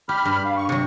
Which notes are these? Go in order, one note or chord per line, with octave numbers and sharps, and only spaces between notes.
G4 B5 F6
G2
F5
C#6
C3 F#3 C#6